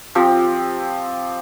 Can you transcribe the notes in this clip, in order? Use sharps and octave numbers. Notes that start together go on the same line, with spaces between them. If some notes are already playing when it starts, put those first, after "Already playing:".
F3 C4 G4